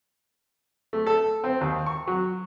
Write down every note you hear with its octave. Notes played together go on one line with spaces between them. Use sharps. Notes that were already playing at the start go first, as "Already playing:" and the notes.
A3
A4
C4
D#2
C#6
F#3